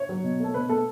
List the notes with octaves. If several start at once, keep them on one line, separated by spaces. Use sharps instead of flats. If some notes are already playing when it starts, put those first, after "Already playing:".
Already playing: C#5
F#3
B2
A3 A4
B2 B4
A3 A4